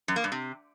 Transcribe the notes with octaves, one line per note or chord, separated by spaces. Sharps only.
F#2
A#3
G2
C3